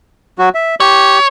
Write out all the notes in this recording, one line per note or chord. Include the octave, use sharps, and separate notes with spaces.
F#3 F#4
E5
G4 C#5